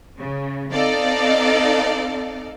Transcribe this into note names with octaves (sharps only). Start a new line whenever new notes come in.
C#3
C4 D#4 A4 D5 D#5 F5